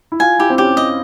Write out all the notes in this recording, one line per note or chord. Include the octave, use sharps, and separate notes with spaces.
E4
F4 G#5
E4 G4
C4
C#4 G4
D#5